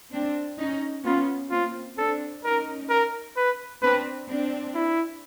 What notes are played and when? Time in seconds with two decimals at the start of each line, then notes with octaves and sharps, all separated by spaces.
0.12 C4 D4
0.58 C#4 D#4
1.05 B3 C#4 F4
1.50 A#3 C4 F4
1.98 C4 D4 A4
2.44 C#4 D#4 A#4
2.89 A#4
3.37 B4
3.82 C4 D4 B4
4.29 C4 D4
4.74 E4